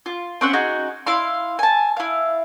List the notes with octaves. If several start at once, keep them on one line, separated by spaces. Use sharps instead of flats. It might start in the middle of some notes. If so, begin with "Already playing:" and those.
F4
C4 C#4 F#5
D#4 F#4 G#4
E4 F5 C6
G#5 A5
E4 F5